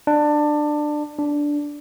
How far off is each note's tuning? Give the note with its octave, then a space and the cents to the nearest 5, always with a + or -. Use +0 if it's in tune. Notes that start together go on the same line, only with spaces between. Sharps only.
D4 +20
D4 -5